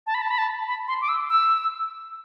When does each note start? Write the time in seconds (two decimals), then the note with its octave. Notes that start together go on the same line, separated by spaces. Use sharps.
0.07 A5
0.14 B5
0.22 A5
0.31 B5
0.38 A5
0.68 B5
0.88 C6
1.01 D6
1.09 E6
1.29 E6